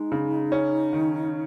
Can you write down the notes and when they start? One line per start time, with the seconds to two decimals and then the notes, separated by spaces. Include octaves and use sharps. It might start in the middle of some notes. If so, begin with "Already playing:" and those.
Already playing: G#3 D#4
0.12 C#3
0.52 C#4
0.93 D#3